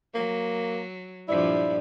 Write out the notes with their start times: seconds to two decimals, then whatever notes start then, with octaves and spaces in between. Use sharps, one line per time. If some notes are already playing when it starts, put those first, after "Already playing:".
0.15 F#3 A#3
1.28 G2 A#2 F3 E4 D5